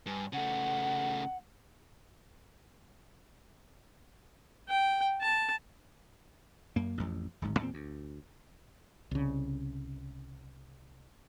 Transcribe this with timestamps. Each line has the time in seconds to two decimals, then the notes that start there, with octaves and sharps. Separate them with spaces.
0.06 G2 G#5
0.33 C#3 A3 F#5
4.69 G5
5.22 A5
6.76 F#2 A#3
6.98 A1 F2
7.42 D1 G#1 G#2
7.59 E2 A#2 B3 C4
7.74 D2
9.11 C2 C#3